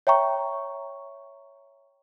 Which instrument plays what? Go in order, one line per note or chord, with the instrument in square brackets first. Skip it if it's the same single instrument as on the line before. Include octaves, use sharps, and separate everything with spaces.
[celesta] C#5 E5 G5 A#5 C#6